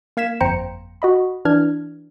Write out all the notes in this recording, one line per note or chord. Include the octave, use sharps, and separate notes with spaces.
A#3 F5 G#6 B6 E7
G1 F2 C5 G5 A#5 C#7
F#4 D#5 B5
E3 D4 F6 G#6